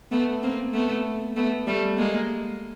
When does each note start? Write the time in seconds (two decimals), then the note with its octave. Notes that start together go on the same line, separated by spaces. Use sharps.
0.12 A3 B3
0.43 A#3 C4
0.73 A3 B3
1.36 A3 B3
1.67 G3 A3
1.97 G#3 A#3